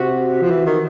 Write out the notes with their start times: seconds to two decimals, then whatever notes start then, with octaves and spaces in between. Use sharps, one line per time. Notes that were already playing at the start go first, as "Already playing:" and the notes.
Already playing: C3 F#4
0.42 F3
0.50 E3
0.66 D#3